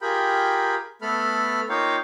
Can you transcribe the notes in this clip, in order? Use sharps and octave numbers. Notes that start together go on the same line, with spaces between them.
F4 G4 G#4 A#4 G5 B5
A3 B3 A4 B5 F6
A#3 D#4 F4 C#5 F5 G5